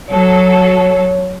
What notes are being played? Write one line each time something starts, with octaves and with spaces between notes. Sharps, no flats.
F#3 A4 C#5